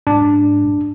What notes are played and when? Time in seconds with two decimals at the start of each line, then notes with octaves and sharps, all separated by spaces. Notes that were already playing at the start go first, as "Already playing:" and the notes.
0.07 G#2 D4